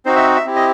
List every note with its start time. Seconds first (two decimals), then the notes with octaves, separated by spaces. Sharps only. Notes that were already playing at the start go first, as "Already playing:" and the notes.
0.05 C4 D#4 F#4 C5
0.16 E5
0.36 E5
0.46 C4 E4 G4
0.56 D#5